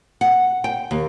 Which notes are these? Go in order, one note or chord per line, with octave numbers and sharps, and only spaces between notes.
F#5
G5
D#2